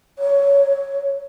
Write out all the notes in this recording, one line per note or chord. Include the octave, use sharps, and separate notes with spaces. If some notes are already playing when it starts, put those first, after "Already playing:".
C#5